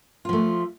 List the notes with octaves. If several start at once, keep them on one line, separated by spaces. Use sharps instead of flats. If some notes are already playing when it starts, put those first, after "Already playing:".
F3 A3 F4